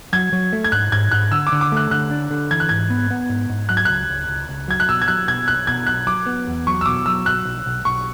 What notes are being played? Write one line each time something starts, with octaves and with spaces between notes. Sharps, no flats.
F#3 G#6
F#3
A3
G#6
G#2 F#6
G#2 G#6
G#2 F#6
D3 E6
D6
D3
D6
A3 F#6
D3 F#6
D4
D3
E3 G#6
F#6
G#2 G#6
B3
B3
G#2
G#2
F#3 F#6
G#6
C#2 F#6
C#2
C#2
C#2
F#3 G#6
F#6
B2 E6
G#6
F#3 F#6
B2 G#6
B1 F#6
B2 G#6
B1 F#6
F#3 D6
B3
E2
F#3 C#6
E6
B2 D6
F#3 E6
B1 F#6
B1
B1
B1 C#6